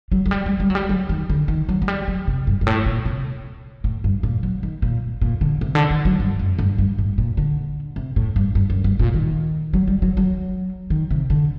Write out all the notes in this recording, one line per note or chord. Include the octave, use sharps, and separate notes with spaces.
F#3
F#3
G3
G3
G3
F#3
G3
F#3
D#3
D3
D#3
F#3
F#3
G3
F#3
C3
G2
G2
A2
A#2
C3
A2
G2
A#2
F#3
D#3
A#2
A#2
D3
C3
D3
D#3
F#3
G2
F#2
G2
G2
A2
A#2
D3
C3
A2
G2
G2
F#2
G2
A#2
D#3
F#3
G3
F#3
F#3
D#3
C3
D3